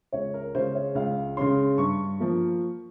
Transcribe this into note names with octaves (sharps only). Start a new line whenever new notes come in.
C#2 C#5
A#4
C#3 G#3 C#4 C5
C#5
C#2 F5
C#3 G#3 C#4 C6
G2 C#6
F3 A#3